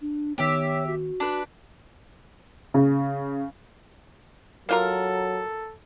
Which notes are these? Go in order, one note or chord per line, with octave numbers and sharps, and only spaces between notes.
D4
D#3 B3 G4 C#5 E5
F#4
D4 B4
C#3
F#3 A#3 F4 A4 A#4